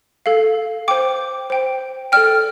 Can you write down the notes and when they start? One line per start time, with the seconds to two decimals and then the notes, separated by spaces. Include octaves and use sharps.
0.26 A4 F5
0.88 C5 G5 D6
1.50 C5 G5
2.12 A4 D5 G5 F6